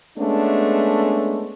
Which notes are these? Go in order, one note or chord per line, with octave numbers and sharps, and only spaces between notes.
G#3 A3 B3 C#4 D4